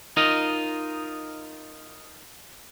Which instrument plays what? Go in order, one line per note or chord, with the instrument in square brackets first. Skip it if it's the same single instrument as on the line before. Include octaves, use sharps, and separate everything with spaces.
[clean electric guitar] D#4 F4 A#4 D#5